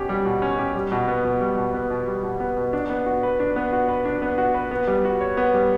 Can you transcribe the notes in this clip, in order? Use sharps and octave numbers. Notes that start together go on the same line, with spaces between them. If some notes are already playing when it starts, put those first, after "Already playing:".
Already playing: B2 C#4 G4
G3
B2
C#4
G4
G3
B2
B3
B2
G3
B2
B3
B2
G3
B2
B3
B2
D4
B3
F#4
B4
D4
B3
F#4
B4
D4
B3
F#4
B4
B3
G3
F#4
C#5
B3
G3